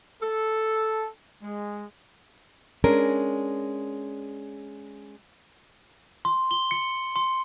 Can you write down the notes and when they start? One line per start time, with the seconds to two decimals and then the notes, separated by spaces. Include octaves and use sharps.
0.21 A4
1.42 G#3
2.84 G#3 C#4 D4 A#4
6.25 C6
6.51 G7
6.71 C#7
7.16 C6